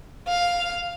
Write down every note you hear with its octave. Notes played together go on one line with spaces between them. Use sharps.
F5